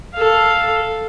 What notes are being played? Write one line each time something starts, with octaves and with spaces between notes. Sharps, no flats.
A4 F5